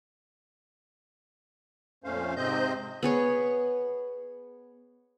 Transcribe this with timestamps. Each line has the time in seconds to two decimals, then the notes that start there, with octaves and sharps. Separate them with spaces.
2.04 F2 A#2 A3 C#4 C5 F5
2.36 G#2 C3 C4 C5 D#5 G6
3.03 B3 G#4 C#5